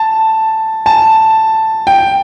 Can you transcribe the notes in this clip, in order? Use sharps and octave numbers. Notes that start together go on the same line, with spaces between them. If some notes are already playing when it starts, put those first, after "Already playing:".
Already playing: A5
A5
G5